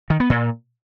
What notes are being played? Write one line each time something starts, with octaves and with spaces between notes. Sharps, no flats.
D#3
B3
A#2